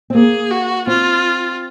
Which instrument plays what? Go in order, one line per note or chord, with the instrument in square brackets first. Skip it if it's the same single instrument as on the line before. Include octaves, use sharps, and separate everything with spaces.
[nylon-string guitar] C4
[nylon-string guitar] A#3 [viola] G#4
[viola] F#4
[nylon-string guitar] C4 [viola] F4